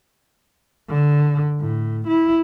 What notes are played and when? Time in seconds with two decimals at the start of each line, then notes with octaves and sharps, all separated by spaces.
0.88 D3
1.60 A2
2.07 E4